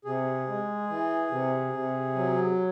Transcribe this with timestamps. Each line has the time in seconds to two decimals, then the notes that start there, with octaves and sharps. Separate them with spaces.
0.05 C3 G#4
0.47 G#3
0.89 E3
1.31 C3
1.73 C3
2.15 F#3